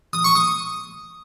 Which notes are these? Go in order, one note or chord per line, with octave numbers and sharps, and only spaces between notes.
D#6
C#6
D#6